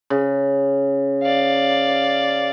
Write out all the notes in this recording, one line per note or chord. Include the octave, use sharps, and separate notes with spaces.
C#3
D5 F5